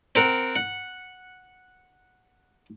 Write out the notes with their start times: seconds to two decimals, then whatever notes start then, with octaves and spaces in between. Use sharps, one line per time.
0.15 C4 A#4 F#5
0.56 F#5